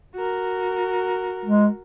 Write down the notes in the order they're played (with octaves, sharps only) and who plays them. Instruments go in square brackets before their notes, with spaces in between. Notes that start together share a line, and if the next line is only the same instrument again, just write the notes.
[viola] F#4 A#4
[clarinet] G#3